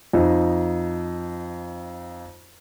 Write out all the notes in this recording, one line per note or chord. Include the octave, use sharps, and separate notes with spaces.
F2 D#4